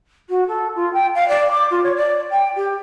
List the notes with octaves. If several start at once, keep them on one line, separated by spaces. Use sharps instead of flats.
F#4
A4
F4
G5
F5
D5
D6
F4
C#5
D5
G5
G4